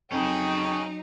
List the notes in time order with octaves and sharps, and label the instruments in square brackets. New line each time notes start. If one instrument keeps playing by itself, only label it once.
[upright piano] F2 [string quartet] F#3 D#4 [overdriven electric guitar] C#4 G#4 [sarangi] G5